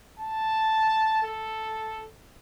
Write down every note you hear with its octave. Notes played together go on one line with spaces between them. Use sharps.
A5
A4